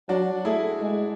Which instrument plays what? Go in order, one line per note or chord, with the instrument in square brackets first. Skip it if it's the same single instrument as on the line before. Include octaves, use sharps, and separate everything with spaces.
[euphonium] F#3 [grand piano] D4 F#4
[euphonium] A3 [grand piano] E4 G#4
[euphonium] G#3